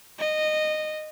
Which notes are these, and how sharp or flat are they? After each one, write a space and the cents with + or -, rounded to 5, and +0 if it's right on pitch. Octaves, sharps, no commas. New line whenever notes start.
D#5 -15